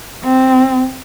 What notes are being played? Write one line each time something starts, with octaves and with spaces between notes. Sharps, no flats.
C4